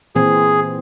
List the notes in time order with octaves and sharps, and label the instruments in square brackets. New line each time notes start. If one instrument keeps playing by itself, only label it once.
[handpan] A#2 E3 C4 [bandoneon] G#4